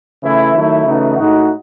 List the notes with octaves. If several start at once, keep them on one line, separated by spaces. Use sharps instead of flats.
C#3 E3 A3 E4
D#3 F#3 A3 E4
C#3 E3 A3 D#4 F#4
A2 G#3 D#4 F#4